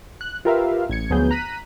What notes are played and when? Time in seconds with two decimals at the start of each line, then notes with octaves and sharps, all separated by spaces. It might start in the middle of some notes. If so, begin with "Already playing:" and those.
0.21 F#6
0.45 F4 G4 A#4 B4 E5 F5
0.90 A1 G#6 C#7
1.10 D2 F3 F#3 B3 G#4 G6
1.31 A#5 F#6 B6 D#7